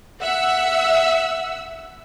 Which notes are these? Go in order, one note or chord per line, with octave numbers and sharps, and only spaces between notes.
E5 F#5 E6